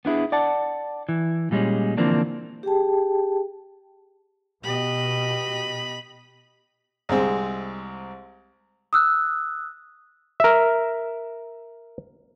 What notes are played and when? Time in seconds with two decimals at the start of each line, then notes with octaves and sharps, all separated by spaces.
0.05 B3 D4 E4 G#4
0.32 D5 F#5 A5
1.09 E3
1.51 A#2 G3 G#3 C#4
1.98 D3 E3 F3 A#3 C4 D4
2.63 G4 G#4 G5 A5
4.64 B2 G4 D#5 B5
7.09 C2 G#3 C4
8.93 D#6 E6 F#6
10.40 A#4 E5